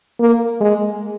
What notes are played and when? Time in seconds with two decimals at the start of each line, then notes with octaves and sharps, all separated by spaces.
0.20 A#3
0.61 G#3